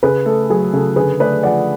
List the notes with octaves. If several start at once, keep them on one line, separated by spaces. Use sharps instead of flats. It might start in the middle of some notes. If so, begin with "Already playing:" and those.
C#3 G#4 B4
A3 A4
F#3 G#4
C#3 A4
D3 G#4 B4
A3 B4 D5
F3 D5 F#5